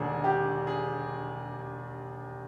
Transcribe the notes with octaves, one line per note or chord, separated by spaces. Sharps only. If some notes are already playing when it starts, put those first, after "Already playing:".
Already playing: E1 D#2 D3 G#4
G4
G#4